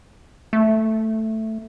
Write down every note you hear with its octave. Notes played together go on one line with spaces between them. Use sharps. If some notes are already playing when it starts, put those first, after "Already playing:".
A3